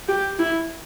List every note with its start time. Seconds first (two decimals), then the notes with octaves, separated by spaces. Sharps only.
0.08 G4
0.39 E4